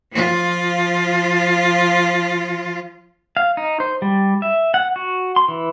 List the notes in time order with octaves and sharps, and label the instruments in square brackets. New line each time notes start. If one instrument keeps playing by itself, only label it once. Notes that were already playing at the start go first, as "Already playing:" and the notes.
[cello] F3 F4
[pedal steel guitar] F5
D#4
C5
G3
E5
F#5
F#4
C6
E3